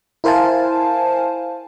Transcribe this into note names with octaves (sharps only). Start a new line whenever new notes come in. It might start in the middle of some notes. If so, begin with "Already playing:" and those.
E4 A#4 C5 F5 G#5 A5